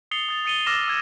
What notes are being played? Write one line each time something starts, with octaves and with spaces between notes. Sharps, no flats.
D#6 A6 C7 C#7 F7 G7
D#6 A6 F7
D#6 A6 C#7 D#7 F7 G7
D6 E6 F6 A6 A#6 E7
E6 G#6 E7